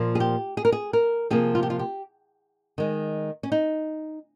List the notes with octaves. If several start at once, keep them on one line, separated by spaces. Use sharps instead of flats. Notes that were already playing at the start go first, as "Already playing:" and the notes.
Already playing: A#2 F3 A#3
G#4
G4
G#4
A#4
G#4
A#4
C3 F3 A#3 G#4
F4
G4
F4
G4
D#3 G#3
C#4
D#4